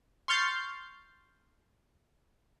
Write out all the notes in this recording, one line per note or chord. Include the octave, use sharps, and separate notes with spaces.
C6 C#6 F6 G6 A6 C7